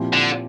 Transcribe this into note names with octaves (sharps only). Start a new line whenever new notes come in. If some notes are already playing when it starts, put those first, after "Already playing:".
Already playing: A#2 F3 C4 E4 G4
D3